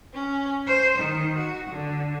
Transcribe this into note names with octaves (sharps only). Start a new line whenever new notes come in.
C#4
C5
D#3
F#4
D3